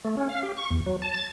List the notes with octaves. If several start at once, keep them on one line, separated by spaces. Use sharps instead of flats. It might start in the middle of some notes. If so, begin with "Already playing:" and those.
A3
C#4
F5
G4
C#6
E2
F#3
A5
A6